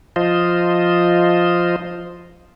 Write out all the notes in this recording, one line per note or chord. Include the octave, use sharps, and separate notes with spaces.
F3 F4 C5 D#5